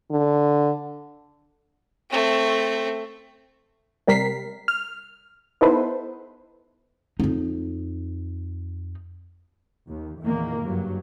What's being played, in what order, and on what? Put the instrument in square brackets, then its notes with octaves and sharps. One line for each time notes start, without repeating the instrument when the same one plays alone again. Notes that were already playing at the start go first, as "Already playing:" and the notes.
[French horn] D3
[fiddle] A3 C4
[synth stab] C3 G3 A#4 B6 C7
F6
B3 D#4 E4 A4 B4 C5
[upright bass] F2 D#4
[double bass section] D#2
E2 A#2 D#3 A#3
F#1 G2 F#3